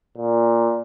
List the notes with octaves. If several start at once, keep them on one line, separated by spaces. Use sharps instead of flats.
A#2